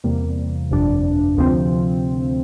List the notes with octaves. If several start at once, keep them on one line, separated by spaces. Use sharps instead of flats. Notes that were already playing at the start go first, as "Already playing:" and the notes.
E2 C3 G3 A#3
G1 F2 C3 G3 D4
D2 C3 F3 C4